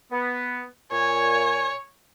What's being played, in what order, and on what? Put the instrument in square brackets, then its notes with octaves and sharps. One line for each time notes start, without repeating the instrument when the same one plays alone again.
[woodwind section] B3
[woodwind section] A#2 G#5 [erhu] C#5